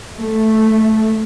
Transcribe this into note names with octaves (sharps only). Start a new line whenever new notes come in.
A3